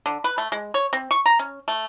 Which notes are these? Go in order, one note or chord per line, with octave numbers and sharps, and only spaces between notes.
D3
B4
A3
G#3
C#5
C4
C#6
A#5
C#4
A3